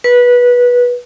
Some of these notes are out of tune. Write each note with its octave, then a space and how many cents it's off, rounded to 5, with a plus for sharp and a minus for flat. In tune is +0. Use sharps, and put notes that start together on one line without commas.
B4 -20